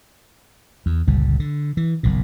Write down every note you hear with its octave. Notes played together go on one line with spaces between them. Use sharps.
E2
G1 C#2 A#2 G3
D3
E3
F#1 B1 A#2